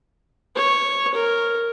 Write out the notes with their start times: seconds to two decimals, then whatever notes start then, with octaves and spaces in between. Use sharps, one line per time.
0.56 C#5
1.14 A#4